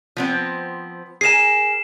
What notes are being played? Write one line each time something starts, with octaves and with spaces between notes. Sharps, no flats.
F3 B3 C4
G#4 A#4 G#5 C7 E7